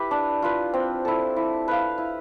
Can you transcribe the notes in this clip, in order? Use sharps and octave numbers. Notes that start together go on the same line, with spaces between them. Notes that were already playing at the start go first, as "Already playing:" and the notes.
Already playing: E4 G4 B4
D4
F4 B4
C4
E4 A4
E4
B4 F5
E4